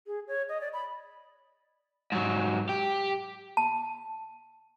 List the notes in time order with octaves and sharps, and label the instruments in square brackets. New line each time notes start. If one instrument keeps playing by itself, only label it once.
[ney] G#4
C#5
D#5
D5
B5
[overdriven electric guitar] G#2 F#3
G4
[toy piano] A5